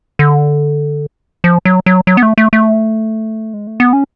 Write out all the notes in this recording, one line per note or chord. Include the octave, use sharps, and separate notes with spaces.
D3
F3
F#3
F#3
F#3
B3
A3
A3
A3
G#3
A3
B3
C#4